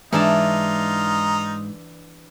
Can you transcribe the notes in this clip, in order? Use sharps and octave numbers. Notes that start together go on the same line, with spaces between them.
G#2 E3 D4 D#4 F4 A5